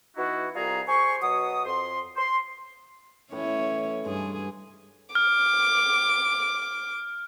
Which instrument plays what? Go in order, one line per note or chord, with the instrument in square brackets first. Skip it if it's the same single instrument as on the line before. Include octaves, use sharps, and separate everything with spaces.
[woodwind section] E3 B3 D#4 E4 F#4
C2 G3 F4 G#4 A#5
G#4 C5 G#5 C6 C#6
B2 F#3 F#4 D#6
F2 C6
C6
[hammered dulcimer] A2 E3 A5 [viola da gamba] C#4 E4 C#5
[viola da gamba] G2 G#4 [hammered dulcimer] G#3
[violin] D6 [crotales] F6